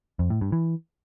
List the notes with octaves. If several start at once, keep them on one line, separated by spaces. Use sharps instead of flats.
F2
A2
G2
E3